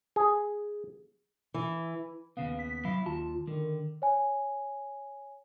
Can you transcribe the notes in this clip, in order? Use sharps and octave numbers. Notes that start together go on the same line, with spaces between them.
G#4
E3
D#2 C#3 B3 F5
B6
F#3 E4 F5
D#2 F4 A5
D3 D#3
C#5 G#5